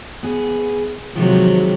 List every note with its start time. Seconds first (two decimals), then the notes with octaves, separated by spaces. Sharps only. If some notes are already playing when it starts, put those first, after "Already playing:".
0.23 B3 G#4
1.16 C3 D#3 F3 F#3 G#3